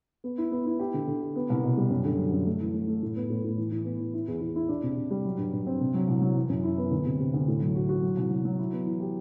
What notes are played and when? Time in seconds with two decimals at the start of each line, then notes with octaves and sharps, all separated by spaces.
0.24 B3
0.38 E4
0.52 B3
0.66 E4
0.79 G4
0.94 D3
1.07 D3
1.21 G4
1.36 B3
1.50 C2
1.63 B2
1.77 G3
1.90 F#2
2.05 D3
2.19 F#3
2.32 F#2
2.46 A3
2.61 E3
2.74 A3
2.88 A3
3.03 A2
3.16 B3
3.30 A2
3.44 A2
3.57 E3
3.71 E3
3.85 B3
3.99 E3
4.14 E4
4.28 E2
4.41 E2
4.56 E4
4.69 D4
4.83 C3
4.97 C3
5.11 G3
5.25 F#3
5.38 G2
5.53 G2
5.67 C4
5.81 C3
5.94 F#3
6.08 C2
6.22 F#3
6.36 E3
6.49 F#2
6.63 E4
6.78 B3
6.91 D2
7.06 C3
7.20 C3
7.34 D2
7.48 A2
7.62 F#3
7.75 F#4
7.89 F#4
8.03 F#3
8.17 C2
8.30 F#3
8.45 F#3
8.59 E4
8.73 B3
8.86 E3
9.00 G4